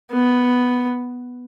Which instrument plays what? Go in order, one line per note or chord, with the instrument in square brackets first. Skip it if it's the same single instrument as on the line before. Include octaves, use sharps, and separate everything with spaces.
[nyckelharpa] B3